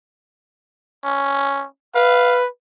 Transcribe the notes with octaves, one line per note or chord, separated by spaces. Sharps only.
C#4
B4 F5